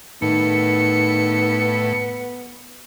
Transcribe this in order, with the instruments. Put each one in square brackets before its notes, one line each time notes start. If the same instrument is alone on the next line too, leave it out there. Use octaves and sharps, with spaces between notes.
[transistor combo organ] A2 [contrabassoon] D#3 [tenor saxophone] B3 [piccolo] C#7